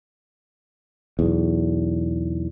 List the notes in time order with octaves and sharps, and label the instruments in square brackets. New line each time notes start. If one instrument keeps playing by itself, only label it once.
[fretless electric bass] B1 E2